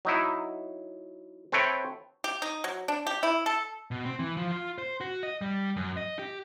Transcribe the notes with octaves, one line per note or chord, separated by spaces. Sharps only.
F#3 D#4 E4
C4 A4 B4 C#5 E5 G5
G4
D#4
F#3
D4
G4
E4
A4
B2
C4
E3
F3
F4
C5
F#4
D#5
G3
F#2
D#5
G4